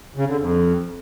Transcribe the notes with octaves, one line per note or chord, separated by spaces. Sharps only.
C#3
D3
F2